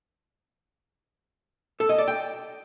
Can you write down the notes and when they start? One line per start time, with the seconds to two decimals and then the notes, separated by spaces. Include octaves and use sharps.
1.80 A4
1.89 D#5
1.98 D5
2.08 G5